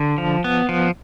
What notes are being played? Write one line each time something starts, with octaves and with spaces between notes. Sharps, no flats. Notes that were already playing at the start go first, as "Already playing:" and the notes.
Already playing: D3
F3
B3
F3